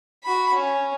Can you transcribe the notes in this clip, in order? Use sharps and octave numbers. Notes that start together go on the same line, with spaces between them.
F#4 B5
C#4